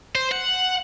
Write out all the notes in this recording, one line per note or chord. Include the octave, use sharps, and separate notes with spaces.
C5
F#5